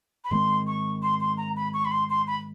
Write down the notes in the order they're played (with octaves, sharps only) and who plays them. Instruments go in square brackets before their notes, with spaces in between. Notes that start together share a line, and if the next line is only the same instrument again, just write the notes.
[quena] B5
[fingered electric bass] G#2 D#3 G#3 C4 [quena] C6
[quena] C#6
C6
C6
A#5
B5
C#6
B5
C6
C6
B5